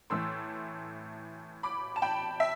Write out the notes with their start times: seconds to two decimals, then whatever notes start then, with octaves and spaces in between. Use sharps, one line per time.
0.10 A2 E3 A3 C6 E6
1.63 B5 D6
1.96 A5
2.02 G5 B5
2.40 E5